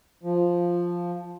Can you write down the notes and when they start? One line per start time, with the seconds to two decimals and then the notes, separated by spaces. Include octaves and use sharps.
0.23 F3